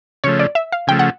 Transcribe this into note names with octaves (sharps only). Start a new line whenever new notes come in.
C#3 F3 A3 C#5
D5
E5
F5
C#3 F3 A3 G5
F#5